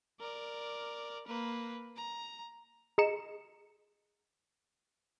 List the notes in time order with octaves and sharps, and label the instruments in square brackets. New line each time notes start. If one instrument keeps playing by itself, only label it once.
[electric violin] A#4 D5
A#3 B4
A#5
[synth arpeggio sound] G#4 D#5 A#5 C#7 E7